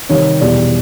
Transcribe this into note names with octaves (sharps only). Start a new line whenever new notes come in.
C3 D#3 G3 C#5
E2 B2 G3 D5